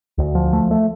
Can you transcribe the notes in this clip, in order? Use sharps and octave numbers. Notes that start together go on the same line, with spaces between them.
D2
F3
A3
A3